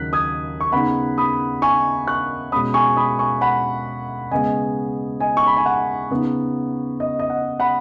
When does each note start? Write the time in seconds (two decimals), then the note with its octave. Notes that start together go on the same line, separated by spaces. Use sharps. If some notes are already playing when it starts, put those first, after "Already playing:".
Already playing: D#2 C#3 F#3 F#6 B6
0.13 D#6 G#6
0.61 C#6
0.72 C#3 B3 D#4 F#5 B5
1.18 B5 D#6
1.62 G#5 C#6
2.07 C#6 F#6
2.52 B2 G#3 C#4 B5 D#6
2.74 G#5 C#6
2.97 B5 D#6
3.19 G#5 C#6
3.41 F#5 B5
4.31 C#3 G#3 B3 D#5 G#5
5.20 D#5 G#5
5.37 C#6
5.46 B5
5.57 G#5
5.66 F#5
6.11 C#3 B3 D#4
7.00 D#5
7.19 D#5
7.30 F#5
7.60 F#5 B5